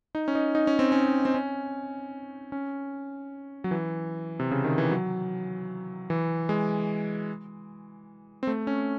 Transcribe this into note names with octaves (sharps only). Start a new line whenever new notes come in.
D#4
C#4
D#4
D#4
C#4
C4
C#4
C4
C#4
C#4
F#3
E3
C3
C#3
D#3
E3
F#3
E3
G#3
C4
A3
C#4